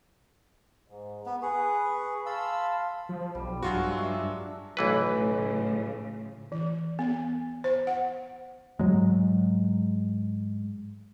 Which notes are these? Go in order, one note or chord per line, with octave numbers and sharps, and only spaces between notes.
G#2
B3
G#4 B4 C#6
F5 A5 B5 C6 E6
F3
B1 G3
G2 F#3 G#3 F4 F#4 A4 C#5
D4 E5 G#5
B1 A2 C#3 E3 F3 B4
E3
B3
C5
F#5
G#2 F#3 G#3